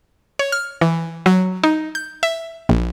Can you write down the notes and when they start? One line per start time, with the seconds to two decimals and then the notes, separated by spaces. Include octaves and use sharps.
0.39 C#5
0.52 F6
0.81 E3
1.26 F#3
1.64 D#4
1.95 G6
2.23 E5
2.69 A#1